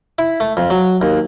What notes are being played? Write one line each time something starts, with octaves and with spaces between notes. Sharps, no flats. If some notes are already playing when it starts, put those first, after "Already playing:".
E4
A3
F2
F#3
D#2